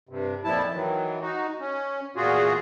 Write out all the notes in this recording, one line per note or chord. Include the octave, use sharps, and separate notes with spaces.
G2 C3
F2 A#2 F3 E4 A5
D#3 E3 F#3
D#4 F#4
C#4
E2 A#2 F4 F#4 G#4